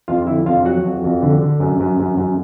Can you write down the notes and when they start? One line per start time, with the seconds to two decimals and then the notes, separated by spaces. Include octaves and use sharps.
0.08 F2 F4 F5
0.27 D3 E4 E5
0.46 F2 F4 F5
0.65 F#3 F#4 F#5
0.84 F2
1.04 F2
1.22 D3
1.41 D3
1.60 F#2
1.80 F#2
2.00 F#2
2.17 F#2